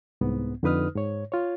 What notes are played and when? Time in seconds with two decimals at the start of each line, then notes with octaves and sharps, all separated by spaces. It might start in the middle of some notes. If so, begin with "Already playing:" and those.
0.21 C2 G#2 B3
0.63 F2 D3 D#4 B4 D#6 F6
0.95 G#2 C#5
1.32 F4 C#5